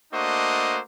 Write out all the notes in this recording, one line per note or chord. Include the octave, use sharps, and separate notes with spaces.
A3 A#3 D4 F#4 C5 D#5